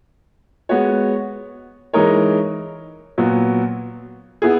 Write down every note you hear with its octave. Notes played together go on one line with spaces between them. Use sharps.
G#3 B3 F#4 C#5
E3 G#3 D#4 A#4 C#5
A#2 F#3 B3 F#4
B3 E4 G#4